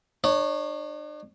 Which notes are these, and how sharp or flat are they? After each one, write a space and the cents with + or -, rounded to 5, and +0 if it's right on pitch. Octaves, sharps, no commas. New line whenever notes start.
D4 +45 C#5 -5